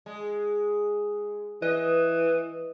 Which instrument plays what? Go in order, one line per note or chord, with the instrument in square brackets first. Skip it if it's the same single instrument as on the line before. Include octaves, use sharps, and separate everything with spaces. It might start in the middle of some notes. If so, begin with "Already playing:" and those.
[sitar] G#3
[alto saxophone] E3 [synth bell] B4 [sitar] D#5